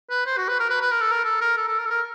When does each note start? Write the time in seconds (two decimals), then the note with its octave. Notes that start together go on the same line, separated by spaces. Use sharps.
0.10 B4
0.26 C5
0.37 F#4
0.49 B4
0.60 A#4
0.70 B4
0.81 B4
0.91 A#4
1.01 A4
1.11 A#4
1.25 A4
1.41 A#4
1.57 A4
1.68 A4
1.79 A#4
1.86 A4
1.90 A#4